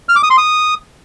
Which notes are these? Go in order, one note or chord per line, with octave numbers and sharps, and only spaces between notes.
F6
D6
D#6
C6
D#6